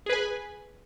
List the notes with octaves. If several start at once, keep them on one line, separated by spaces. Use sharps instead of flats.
G#4 B4 G#5